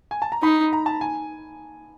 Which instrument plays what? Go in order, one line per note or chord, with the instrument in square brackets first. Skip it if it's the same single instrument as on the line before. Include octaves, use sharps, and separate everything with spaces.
[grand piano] G#5
A5
A#5
[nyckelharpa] D#4 [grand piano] B5
[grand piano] A#5
A5
G#5